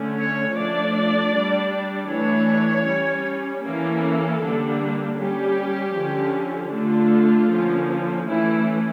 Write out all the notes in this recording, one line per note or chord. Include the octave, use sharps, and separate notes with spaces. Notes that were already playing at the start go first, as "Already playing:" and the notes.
Already playing: D3 A3 C#4
C#5
F3 A3 D4 D5
G3 D4
E3 A3 D4 C#5
G3 C#4
E3 A#3 C#4 A4
D3 G3 A#3 D4
G3 C#4 G4
D3 F3 C#4
D3 A3 D4 F4
D3 F3 A#3 C#4
E3 A3 C#4 E4